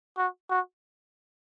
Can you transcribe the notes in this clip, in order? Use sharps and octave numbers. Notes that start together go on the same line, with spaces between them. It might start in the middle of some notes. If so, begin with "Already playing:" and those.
F#4
F#4